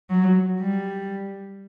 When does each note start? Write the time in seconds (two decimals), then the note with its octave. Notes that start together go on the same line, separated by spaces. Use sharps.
0.10 F#3
0.60 G3